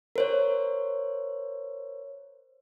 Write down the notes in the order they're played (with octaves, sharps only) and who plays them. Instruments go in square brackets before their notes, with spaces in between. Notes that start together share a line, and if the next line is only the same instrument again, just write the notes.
[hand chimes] A#4 C5 C#5